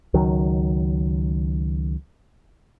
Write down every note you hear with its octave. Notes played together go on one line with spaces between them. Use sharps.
C#2 D#3 F#3